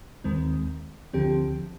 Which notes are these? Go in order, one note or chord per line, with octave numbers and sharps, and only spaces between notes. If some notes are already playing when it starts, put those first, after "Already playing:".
D#2 D#3 G#3 C4
D2 D3 F3 C4 G4